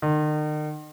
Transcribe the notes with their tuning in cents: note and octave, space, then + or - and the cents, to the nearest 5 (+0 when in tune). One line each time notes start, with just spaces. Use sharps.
D#3 -40